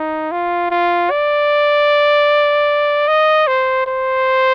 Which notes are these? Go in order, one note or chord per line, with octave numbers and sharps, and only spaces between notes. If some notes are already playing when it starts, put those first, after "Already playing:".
Already playing: D#4
F4
F4
D5
D#5
C5
C5